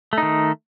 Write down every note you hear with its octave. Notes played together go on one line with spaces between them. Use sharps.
D#3 A3 D#4